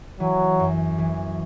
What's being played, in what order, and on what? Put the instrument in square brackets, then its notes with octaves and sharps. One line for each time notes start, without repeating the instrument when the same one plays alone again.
[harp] E3 [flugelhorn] F#3
[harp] F#2
E3